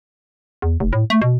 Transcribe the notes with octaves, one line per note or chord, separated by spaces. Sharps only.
E2
F1
A2
A3
B2